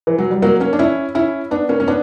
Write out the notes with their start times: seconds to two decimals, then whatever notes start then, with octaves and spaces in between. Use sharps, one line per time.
0.07 E3
0.18 F#3
0.31 G3
0.42 F#3 A#3
0.60 A#3 C#4
0.73 D4
0.79 C#4 E4
1.15 C#4 E4
1.51 B3 D4
1.69 A#3 C#4
1.80 C#4
1.88 B3 D4